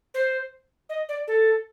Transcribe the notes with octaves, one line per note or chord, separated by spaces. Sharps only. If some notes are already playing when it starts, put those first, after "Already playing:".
C5
D#5
D5
A4